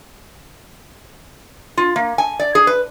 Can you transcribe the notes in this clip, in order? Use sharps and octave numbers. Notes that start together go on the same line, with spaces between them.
F4
A#3
G#5
D5
G#4
B4